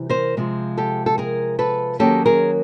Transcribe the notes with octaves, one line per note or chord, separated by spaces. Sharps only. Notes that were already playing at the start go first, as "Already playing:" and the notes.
Already playing: C3 E3 G3
A#4 C5
C3 F3 G#3
G4 A4
A4
G#4 A#4
A4 B4
D#3 F#3 A#3 C#4 G4 A4
G#4 A#4